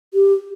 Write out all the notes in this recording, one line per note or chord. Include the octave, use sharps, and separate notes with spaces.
G4